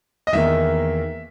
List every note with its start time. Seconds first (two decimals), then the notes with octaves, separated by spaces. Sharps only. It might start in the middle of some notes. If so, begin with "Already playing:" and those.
0.27 D#5
0.32 E2 D#3 A#3 E5